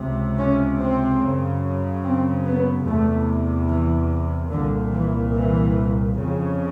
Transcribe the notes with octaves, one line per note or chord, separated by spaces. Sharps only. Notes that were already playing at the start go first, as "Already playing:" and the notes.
Already playing: C#2 C3
C#4
C4
F#2 C#3
C4
B3
E2 C3 A3
E3
C2 A#2 D3
E3
E3
F2 C#3